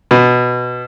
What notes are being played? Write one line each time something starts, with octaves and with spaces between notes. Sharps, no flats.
B2